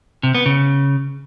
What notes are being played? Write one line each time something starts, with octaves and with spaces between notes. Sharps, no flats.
C3
B3
C#3